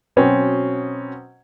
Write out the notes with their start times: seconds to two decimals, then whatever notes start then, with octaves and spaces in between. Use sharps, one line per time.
0.16 B2 F#3 C4 C#4